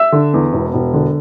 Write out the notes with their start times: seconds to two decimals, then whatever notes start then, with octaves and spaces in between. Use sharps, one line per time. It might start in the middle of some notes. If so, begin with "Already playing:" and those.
Already playing: E5 E6
0.12 D3
0.34 E2
0.53 E1
0.74 E1
0.94 D3